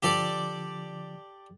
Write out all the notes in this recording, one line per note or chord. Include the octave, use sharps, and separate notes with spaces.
D3 F3 G4 A4 D5 D6